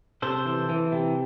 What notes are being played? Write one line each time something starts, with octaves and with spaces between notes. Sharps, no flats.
C3 A4 C5
E3
E3
C3